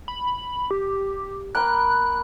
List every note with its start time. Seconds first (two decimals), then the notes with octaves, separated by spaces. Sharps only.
0.08 B5
0.71 G4
1.55 A#3 G5 B5 F#6